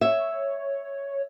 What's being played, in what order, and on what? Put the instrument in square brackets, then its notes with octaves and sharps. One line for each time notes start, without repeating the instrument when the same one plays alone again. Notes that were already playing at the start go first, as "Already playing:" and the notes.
[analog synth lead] C#5 [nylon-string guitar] E5